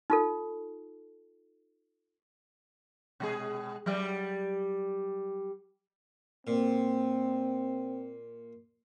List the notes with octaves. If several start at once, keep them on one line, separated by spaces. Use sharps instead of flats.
D#4 F4 A4
B2 G#3 G#4
F#3 G3 D5
A#2 C4